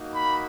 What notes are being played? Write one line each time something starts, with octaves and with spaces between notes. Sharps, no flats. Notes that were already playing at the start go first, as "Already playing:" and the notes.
Already playing: A#3 D#4 F#4
B5